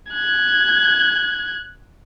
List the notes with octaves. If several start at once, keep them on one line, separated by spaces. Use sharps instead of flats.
F#6 G#6